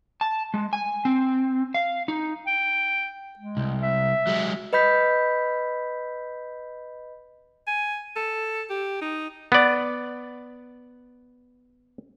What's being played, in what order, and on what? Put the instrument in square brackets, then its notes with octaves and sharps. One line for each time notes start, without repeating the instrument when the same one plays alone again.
[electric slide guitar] A5
G#3
G#5
C4
F5
D#4
[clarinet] G5
G#3
[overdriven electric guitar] C2
[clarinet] E5
[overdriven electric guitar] F#3 G#3
[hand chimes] B4 D#5 B5 G6 B6
[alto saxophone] G#5
A4
G4
D#4
[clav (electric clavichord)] B3 D5